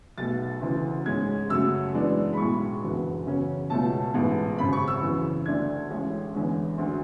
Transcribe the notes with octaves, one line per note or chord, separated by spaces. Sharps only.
B1 B2 A3 A6
D2 C#3 E3
G#2 G#3 C#4 G#6
F#2 C#3 F#3 A3 E6
F#2 E3 G#3 B3 D4
B5
B1 A2 G#3 C#6
F#1 E2 D3 F#3 B3
E2 C#3 F#3 C#4
C#2 B2 A3 C#4 A5
A1 G#2 G#3 B3
G#1 F#2 C#3 B5
C#6
E6
F#2 C#3 E3
D2 D3 A3 D4 G#6
A1 A2 G#3 C#4
E2 D3 G#3 C#4
D2 D3 F#3